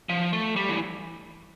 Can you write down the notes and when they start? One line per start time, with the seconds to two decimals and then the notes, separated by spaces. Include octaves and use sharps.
0.09 F3
0.33 A3
0.56 G3
0.69 E3